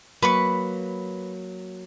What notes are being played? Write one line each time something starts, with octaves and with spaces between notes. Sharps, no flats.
F#3 A#3 B4 B5 C#6